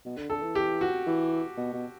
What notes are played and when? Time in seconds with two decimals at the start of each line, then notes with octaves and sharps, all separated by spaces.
0.05 B2
0.17 D3
0.30 D3 A4
0.42 E3
0.55 G4
0.81 F#4
1.07 E3
1.57 B2
1.74 B2